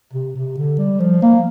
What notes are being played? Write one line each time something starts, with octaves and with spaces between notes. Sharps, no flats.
C3
C3
D3
G3
F3
A#3